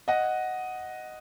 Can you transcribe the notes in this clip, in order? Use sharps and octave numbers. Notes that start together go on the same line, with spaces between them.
D#5 F#5